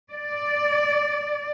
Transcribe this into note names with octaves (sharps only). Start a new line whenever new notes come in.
D5